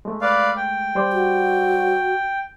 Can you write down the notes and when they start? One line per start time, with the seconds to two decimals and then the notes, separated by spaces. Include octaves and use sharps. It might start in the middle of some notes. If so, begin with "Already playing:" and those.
0.05 G#3 A3
0.21 B4 D5 F5
0.56 G5
0.95 G3 C5 D5
1.13 F#4